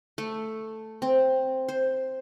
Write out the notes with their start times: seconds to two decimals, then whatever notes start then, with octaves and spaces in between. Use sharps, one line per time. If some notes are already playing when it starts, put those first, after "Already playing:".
0.18 A3
1.02 C4
1.69 C5